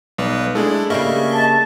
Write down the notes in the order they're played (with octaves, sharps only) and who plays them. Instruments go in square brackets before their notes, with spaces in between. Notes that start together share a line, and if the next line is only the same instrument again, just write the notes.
[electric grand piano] B1 [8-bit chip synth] G3 B4
[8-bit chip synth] G#3 A3 E4 [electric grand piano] D4 G#4 A4
[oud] C#3 G3 A#3 [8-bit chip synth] D#5 E5 C#6
[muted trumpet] A5